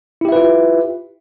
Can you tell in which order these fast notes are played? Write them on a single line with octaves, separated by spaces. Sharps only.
E4 G4 E5 B4 F4